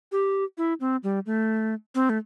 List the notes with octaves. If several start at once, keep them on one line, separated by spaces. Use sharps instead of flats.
G4
E4
C4
G3
A3
C4
A3